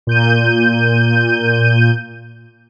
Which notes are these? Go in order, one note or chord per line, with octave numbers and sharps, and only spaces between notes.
A#2 G6 D#7